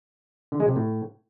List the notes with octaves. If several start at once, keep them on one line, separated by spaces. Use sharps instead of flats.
D3
G#3
C3
A2